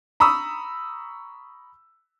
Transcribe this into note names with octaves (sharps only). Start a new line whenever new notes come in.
A#5 B5 C#6 D#6 E6